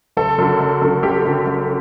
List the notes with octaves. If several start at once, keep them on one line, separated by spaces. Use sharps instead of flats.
F#1 A4
F#2 D3
F#1
F#2 D3
F#1 G4
F#2 D3
F#1